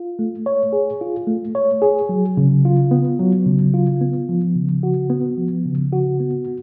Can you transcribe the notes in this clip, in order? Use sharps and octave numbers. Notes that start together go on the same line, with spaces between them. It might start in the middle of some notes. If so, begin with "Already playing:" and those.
Already playing: F4
A3
C#5
G#4
F4
A3
C#5
G#4
F#3
C#3
F4
B3
F#3
C#3
F4
B3
F3
C#3
F#4
B3
F3
C#3
F#4
B3